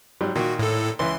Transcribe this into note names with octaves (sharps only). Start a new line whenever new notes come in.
G#2 F#3 G3
A#2 D#3 F#4
A2 A4
C#2 E3 E5 C6